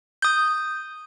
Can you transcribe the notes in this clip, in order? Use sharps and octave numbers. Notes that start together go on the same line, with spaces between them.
D#6 G6